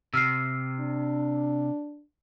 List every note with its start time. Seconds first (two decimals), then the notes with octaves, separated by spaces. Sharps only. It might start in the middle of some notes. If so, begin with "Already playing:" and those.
0.13 C3 E6 F6 C7
0.80 D4